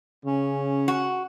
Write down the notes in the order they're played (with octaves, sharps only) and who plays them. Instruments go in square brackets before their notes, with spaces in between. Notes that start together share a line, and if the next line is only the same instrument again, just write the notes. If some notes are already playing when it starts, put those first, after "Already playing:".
[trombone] C#3 [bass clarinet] C#4
[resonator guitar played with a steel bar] F#4